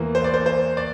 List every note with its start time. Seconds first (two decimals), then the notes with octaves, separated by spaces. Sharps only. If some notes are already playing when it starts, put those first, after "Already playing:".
Already playing: E2 E3 A#3
0.15 C5
0.24 D5
0.34 C5
0.46 C5
0.77 D5